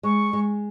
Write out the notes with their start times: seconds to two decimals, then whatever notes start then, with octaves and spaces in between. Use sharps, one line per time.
0.03 G#3 C#6
0.33 G#3